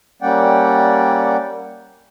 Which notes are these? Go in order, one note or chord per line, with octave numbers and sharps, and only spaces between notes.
G3 A#3 C#4 D5 F#5 G5